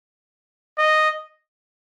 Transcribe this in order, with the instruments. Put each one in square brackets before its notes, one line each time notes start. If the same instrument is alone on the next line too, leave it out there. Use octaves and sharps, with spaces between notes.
[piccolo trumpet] D#5